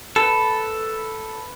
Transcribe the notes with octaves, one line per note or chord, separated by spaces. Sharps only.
A4 B4